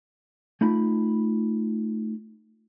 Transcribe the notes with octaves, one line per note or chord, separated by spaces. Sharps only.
A3 D#4 F4 B5